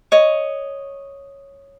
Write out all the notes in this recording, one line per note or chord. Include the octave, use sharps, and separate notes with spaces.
C#5 D#5